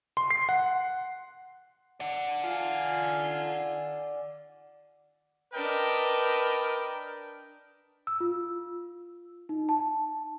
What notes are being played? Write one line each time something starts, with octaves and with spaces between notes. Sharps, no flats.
C6
C7
F#5
D5 F#5
F4 G#5
D4 A#4 B4 D#5 G5
E6
F4
D#4
A5